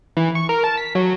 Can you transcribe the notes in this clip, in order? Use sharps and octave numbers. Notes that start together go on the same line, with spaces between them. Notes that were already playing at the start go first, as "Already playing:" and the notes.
E3
C#6
A#4
A5
B6
F#3